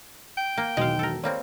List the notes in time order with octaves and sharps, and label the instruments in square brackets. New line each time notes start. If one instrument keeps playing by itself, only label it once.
[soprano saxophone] G5
[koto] A#3
[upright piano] E1 B1 D#3 [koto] G#3 F5
[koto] A4 A#4
[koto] G3 A#3 C4 [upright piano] C#5